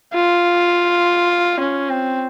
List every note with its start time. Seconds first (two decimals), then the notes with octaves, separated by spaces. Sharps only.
0.14 F4
1.60 C#4
1.90 C4